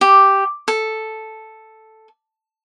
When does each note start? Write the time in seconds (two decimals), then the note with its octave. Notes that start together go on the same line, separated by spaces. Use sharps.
0.01 G4
0.68 A4